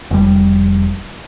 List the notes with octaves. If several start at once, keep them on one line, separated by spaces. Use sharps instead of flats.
F1 G3